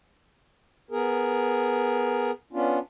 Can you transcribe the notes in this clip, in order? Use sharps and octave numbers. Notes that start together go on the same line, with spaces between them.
B3 G#4 A#4
B3 C#4 D4 F4